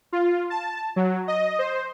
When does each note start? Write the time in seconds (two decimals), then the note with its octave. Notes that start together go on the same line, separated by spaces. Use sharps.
0.12 F4
0.50 A5
0.96 F#3
1.28 D#5
1.59 C5